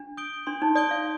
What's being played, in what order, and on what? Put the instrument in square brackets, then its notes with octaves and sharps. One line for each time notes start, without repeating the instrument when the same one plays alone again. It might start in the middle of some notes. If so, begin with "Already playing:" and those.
Already playing: [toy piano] D4
[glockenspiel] D#6 G6 D7 G7
[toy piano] D4 [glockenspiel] C6
[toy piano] D#4
[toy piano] D5 [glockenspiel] D#6 G6 D7 G7
[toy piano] F5